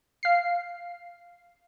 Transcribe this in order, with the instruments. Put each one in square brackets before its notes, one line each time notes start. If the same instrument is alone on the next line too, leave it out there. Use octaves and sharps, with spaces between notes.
[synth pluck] F5 C7